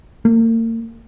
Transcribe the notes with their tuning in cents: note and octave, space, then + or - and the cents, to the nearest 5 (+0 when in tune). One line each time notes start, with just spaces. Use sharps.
A#3 -40